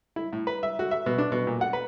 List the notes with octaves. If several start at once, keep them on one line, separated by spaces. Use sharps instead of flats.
E4
A2
B4
E5
F#4
E5
B2
D4
B2
A#2
F#5
B4